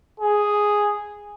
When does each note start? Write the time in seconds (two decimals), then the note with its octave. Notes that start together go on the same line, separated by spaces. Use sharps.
0.20 G#4